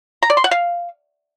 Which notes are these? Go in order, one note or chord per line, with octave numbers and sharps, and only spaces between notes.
A#5
D5
C6
F#5
F5